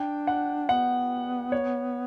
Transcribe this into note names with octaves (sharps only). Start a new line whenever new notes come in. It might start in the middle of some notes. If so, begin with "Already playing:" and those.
Already playing: D4 G5
F#5
B3 F#5
C#5